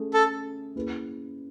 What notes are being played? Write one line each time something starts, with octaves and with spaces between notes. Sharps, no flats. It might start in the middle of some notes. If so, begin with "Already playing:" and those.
Already playing: A3 C#4 G#4
A4
A#3 C#4 E4 G#4 B4